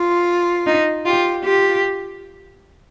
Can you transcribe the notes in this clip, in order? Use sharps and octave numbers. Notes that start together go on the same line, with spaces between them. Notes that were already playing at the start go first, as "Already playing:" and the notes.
Already playing: F4
D#4
F4 G4
F4 G4